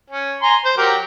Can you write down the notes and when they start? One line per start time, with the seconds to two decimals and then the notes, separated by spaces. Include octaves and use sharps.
0.10 C#4
0.43 G#5 A#5 C6
0.65 C5
0.77 F#3 G4 A#4